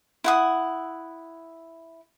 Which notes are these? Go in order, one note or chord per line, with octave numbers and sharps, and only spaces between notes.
E4 F#5 D#6